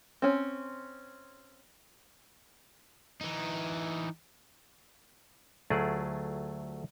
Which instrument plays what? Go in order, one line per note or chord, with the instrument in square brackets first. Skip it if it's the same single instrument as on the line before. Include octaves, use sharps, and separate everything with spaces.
[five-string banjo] C4 C#4
[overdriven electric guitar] E3 D#4
[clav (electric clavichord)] D2 F#3 A3 F4 G#4 D5